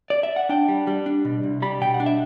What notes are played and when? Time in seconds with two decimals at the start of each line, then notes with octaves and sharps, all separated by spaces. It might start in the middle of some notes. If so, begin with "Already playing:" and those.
0.10 D5
0.23 E5
0.36 F#5
0.49 D4 G5
0.68 G3
0.87 G3
1.06 D4
1.25 B2
1.43 C2
1.62 G3 B5
1.81 B2 G5
1.94 F#5
2.00 D4
2.06 E5